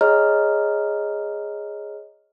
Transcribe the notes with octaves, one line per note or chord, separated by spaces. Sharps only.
G#4 C#5 D#5 A#5 F6